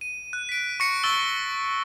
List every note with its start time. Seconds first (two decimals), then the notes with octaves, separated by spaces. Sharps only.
0.01 D#7
0.33 F#6
0.49 B6 D7
0.80 C#6 A#6 C#7
1.03 C#6 E6 A6 C#7 G7